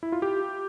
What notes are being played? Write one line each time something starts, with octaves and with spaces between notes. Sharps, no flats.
E4
F4
G4